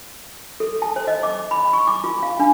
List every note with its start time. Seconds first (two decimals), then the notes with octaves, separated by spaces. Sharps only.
0.60 A4
0.82 A5
0.96 C5
1.07 D#5
1.23 D6
1.51 B5
1.73 C#6
1.87 D6
2.04 F4
2.23 F5
2.39 D4